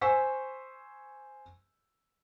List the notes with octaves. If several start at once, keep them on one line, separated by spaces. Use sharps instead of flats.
C5 G#5 C#6 E6 B6